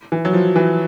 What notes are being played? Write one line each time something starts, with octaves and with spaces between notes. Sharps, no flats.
E3
F#3
F3
E3